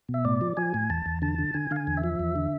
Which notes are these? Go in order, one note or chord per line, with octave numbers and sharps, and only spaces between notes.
B2
E5
A2 D5
F3
F3 G#5
A2
E2 A5
E2
D3 A5
D3
D3 G#5
D3 F5
G#5
E2
E5
F3
E2
D3